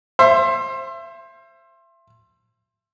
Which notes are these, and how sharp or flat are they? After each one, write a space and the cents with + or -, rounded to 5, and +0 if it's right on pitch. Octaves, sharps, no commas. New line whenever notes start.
C5 +20 E5 +30